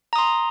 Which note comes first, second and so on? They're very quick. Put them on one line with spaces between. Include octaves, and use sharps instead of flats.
A#5 D#6 C6